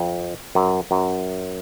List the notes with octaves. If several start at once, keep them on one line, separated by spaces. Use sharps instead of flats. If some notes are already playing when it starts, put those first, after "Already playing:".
Already playing: F2
F#2
F#2